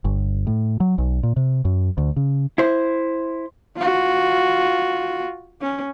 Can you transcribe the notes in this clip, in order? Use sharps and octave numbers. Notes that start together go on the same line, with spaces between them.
G1
A2
F#3
B1
A#2
C3
F#2
D2
C#3
E4 C5
F4 F#4
C#4